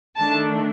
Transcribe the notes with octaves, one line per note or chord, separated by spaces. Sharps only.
D#3 A3 D4 A5